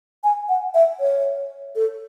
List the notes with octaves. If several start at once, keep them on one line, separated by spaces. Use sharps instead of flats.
G#5
F#5
E5
C#5
A4